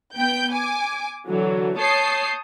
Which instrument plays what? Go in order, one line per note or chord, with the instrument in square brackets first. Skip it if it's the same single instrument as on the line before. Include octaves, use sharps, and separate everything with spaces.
[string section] B3 G5 G6
G#5 D6
D3 E3 F#3
C#5 A5 D#6 G6 C7